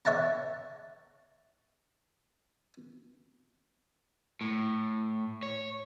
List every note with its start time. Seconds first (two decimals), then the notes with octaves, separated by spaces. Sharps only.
0.05 C#5 E5 F#5 A5 A#5
4.41 A2
5.43 C#5